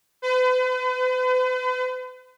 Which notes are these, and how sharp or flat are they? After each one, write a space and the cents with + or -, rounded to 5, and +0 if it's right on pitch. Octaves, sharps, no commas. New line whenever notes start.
B4 +45